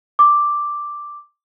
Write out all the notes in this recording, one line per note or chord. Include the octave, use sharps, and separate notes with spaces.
D6